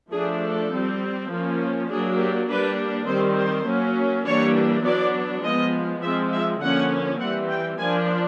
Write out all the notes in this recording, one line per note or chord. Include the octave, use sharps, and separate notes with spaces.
F3 A3 D4 G#4
A4
G3 C4
F3 A#3 C#4
F#3 A#3 D4 G#4
G4
G3 A#3 D4 B4
D#3 G3 C4 C5
C5
F#3 A#3 C#4
E3 G3 A#3 D4 C#5
F#3 B3 D4 D5
F3 G#3 B3 D#5
F3 G#3 C4 E5
E5
D3 F3 A#3 C#4 F#5
E3 G3 C4 F#5
G5
F3 A#3 D4 G#5